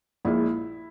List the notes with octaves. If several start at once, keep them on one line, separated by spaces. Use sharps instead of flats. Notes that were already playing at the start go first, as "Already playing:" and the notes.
A#1 A#2 G#3 E4